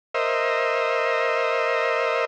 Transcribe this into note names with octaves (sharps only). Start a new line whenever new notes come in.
A#4 C5 D#5 E5